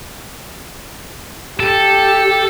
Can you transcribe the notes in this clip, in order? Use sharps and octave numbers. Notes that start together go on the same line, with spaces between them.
G4 A4